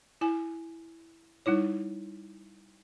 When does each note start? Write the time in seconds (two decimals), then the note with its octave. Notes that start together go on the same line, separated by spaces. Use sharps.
0.21 E4 G#5
1.46 G3 D#4 E4 C#5